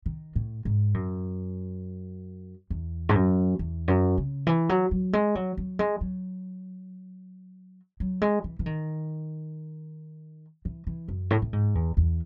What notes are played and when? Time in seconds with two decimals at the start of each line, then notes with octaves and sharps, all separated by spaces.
0.06 D#3
0.35 A2
0.65 G#2
0.94 F#2
2.70 E2
3.09 G#2
3.15 F#2
3.59 E2
3.88 F#2
4.18 C#3
4.47 E3
4.69 F#3
4.91 F#3
5.13 G#3
5.35 F#3
5.57 F#3
5.79 G#3
6.01 F#3
8.00 F#3
8.22 G#3
8.44 E3
8.59 E3
8.66 D#3
10.65 E3
10.87 E3
11.08 F#2
11.31 A2
11.42 A2
11.53 G#2
11.75 E2
11.97 E2